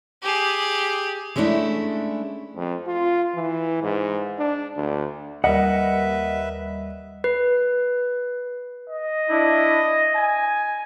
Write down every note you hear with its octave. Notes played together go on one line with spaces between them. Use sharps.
G4 G#4
G#3 A3 C#4 D4 E4
F2
F4
E3
G#2
D4
D2
D#2 G3 A#4 B4 D#5 E5 F#5
B4
D#5
D4 E4
G#5